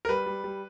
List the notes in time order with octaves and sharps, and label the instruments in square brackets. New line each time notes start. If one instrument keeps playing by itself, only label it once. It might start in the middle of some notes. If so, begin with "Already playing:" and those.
[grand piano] A#4
G3 B4
G3
G3